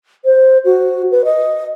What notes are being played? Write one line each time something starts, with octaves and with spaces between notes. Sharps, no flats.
C5
F#4
B4
D#5